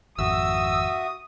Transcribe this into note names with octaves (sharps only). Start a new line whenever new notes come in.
G#1 F2 F#4 E5 D#6 E6